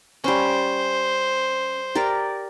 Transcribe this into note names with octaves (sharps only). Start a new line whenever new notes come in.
G3 C#4 C5
G4 A#4 D5